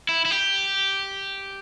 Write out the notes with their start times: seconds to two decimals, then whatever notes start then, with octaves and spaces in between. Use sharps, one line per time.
0.09 E4
0.25 E4
0.31 G4